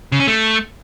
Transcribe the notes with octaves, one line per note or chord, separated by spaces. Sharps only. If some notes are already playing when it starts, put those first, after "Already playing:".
C#3
C#4
A3